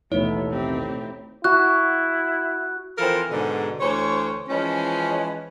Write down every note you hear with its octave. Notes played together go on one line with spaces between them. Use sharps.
A1 D#2 B2 A3 B3 D#4 E4 C#5
C4 G4
E4 F#4 F#6
E3 F3 C4 F4 A4 A#4
G#2 B2 D3
D2 E3 C5 C#5
E3 F3 G#3 C#4